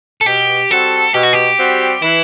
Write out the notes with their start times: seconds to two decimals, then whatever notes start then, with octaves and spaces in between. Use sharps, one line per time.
0.21 A4
0.26 B2 G4
0.71 G3 C4 F#4 A4
1.14 B2 G4
1.23 F#4
1.33 G4
1.59 G3 C4 F#4
2.02 E3 E4